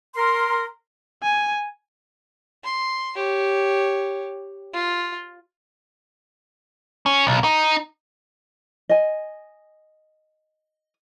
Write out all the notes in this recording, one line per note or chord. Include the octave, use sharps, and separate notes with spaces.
A#4 C6
G#5
C6
G4 C#5
F4
C#4
B1
D#4
D#5 G#5